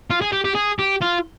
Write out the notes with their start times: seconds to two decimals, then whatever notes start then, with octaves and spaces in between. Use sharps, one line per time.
0.10 F4
0.22 G#4
0.32 G4
0.45 G4
0.55 G#4
0.79 G4
1.01 F4